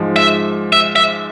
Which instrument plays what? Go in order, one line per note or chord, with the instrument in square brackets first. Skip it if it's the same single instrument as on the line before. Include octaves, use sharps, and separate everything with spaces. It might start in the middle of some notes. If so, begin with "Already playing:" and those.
Already playing: [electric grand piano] G#2 F3 G#3
[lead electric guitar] E5
E5
E5